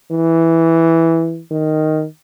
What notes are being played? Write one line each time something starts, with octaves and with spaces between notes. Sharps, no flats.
E3
D#3